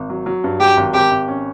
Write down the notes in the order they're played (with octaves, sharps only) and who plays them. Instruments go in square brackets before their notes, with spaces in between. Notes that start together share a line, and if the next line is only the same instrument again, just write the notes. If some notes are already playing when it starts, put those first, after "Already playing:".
Already playing: [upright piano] G#1
F#3
F#3
G2
[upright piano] F#3 [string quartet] G4
[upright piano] G#1
[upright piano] G#1 [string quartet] G4
[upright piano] G#1
C#4